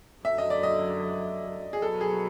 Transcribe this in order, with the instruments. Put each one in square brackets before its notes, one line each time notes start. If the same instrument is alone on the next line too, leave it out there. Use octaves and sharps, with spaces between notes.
[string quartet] F#2 D3 F#3 [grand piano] E5
[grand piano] D#5
D5
D#5
G#4
[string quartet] B2 F#3 B3 [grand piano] A4
[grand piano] G#4